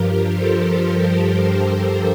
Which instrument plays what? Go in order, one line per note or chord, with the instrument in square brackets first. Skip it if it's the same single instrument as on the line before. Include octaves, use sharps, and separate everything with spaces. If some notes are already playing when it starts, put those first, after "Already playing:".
Already playing: [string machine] G2 F3 G4 A#4
A4 C5